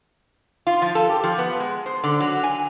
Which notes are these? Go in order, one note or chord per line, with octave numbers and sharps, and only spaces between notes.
F4
F3
A4
G4
F3
B3
G#3
C5
D3
F#3
G#5